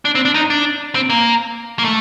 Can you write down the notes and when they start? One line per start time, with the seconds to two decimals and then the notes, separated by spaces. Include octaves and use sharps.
0.05 D4
0.15 C4
0.25 D4
0.35 D#4
0.50 D4
0.95 C4
1.10 A#3
1.79 A#3
1.84 A3